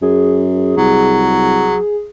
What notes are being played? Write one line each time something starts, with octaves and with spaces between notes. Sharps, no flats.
F#2 G#4
C2 F#3